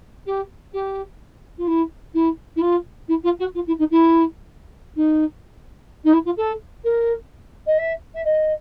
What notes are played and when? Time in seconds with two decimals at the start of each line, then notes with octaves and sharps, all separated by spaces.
0.25 G4
0.72 G4
1.58 F4
1.67 E4
2.14 E4
2.56 E4
2.61 F4
3.08 E4
3.23 F4
3.39 F#4
3.54 F4
3.67 E4
3.78 D#4
3.90 E4
4.96 D#4
6.04 D#4
6.13 E4
6.25 F4
6.37 A4
6.84 A#4
7.66 D#5
7.78 E5
8.14 E5
8.24 D#5